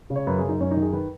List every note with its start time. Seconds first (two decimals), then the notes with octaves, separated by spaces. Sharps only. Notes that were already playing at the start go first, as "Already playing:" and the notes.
0.10 C#3
0.16 C#5
0.27 F#2 B4
0.38 F#2 G#4
0.49 D#4
0.60 F#2 C#4
0.71 D#4
0.77 D#3
0.82 G#4
0.93 D#3 B4